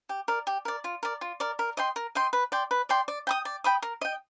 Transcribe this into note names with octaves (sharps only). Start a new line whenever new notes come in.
G4
A#4 D5
G4
A#4 D5
F4
A#4 D5
F4
A#4 D5
A#4
D#5 G5 C6
A#4
D#5 G5 C6
B4
D5 G5 C6
B4
D5 G5 C6
D5
G5 B5 D#6
D5
G5 B5 D#6
A#4
D#5 G5